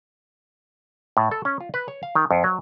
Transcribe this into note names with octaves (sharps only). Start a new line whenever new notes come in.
A2
A4
C#4
F4
B4
C#5
F5
D#3
F2
F#3